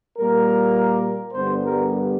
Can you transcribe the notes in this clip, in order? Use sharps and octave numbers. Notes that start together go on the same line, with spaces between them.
A#2 G3 A#3 A#4
G2 D3 G3 B3 C5
A#4